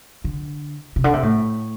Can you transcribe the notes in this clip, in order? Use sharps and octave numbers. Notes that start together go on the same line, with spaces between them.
D3
C3
D3
C3
A2